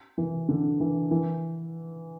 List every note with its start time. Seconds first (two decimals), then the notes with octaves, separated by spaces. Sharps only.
0.18 E3
0.49 D3
0.80 E3
1.11 E3